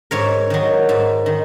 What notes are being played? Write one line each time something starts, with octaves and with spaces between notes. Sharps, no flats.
G#2 A#4 C#5
D#3 F#3
G#2
D#3